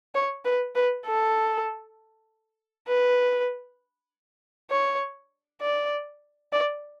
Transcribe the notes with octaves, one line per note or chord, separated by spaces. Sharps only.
C#5
B4
B4
A4
B4
C#5
D5
D5